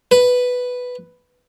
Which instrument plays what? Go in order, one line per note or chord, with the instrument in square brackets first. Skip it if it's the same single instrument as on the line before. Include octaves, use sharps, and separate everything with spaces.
[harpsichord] B4